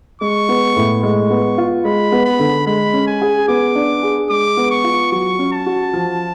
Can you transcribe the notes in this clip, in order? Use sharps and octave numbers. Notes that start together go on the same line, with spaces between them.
G#3 C#6
B3
A2
G#3 C#6
B3
F4
G#3 B5
B3
B5
D3
G#3 B5
C#4
G#5
G#4
B3 D6
D4
G#4
G#3 D6
B3
C#6
F4
F#3 C#6
C#4
A5
F#4
F3